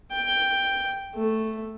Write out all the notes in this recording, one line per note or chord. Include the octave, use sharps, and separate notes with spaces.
G5
A3